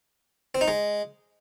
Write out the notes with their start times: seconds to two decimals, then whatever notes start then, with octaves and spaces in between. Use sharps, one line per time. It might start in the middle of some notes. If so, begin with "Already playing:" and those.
0.55 C4
0.61 D#4
0.68 G#3